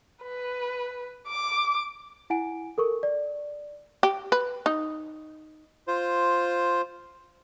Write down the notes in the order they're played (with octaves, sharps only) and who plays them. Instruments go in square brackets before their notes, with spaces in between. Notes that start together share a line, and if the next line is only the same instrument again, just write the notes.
[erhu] B4
D6
[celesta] E4 F#5 G#5 D7
A4 A#4 C#6
D5
[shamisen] G4
B4
D#4
[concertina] F4 C5